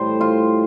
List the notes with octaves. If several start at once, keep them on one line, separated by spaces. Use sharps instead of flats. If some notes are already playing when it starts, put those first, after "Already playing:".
Already playing: A2 G3 C5
F4